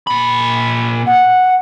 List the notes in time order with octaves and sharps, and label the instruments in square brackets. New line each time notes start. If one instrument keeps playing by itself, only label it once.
[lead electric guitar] A#2 B5
[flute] F#5